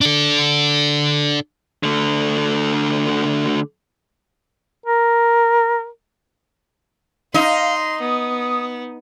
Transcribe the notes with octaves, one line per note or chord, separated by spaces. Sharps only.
D4 A4
D3 A3
A#4
D#4 F5 C6
B3 D#6